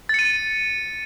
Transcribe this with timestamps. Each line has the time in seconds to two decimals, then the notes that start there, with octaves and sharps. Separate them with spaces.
0.09 A6
0.14 C#7
0.19 D#7